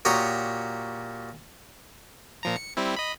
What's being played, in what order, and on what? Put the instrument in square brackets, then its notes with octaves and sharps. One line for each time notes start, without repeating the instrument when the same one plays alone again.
[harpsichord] A#2 F#4 G4 C#5 A#5 D#6
[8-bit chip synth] A#2 F3 A#5
C#7
G3 C4 E4
D#5 B5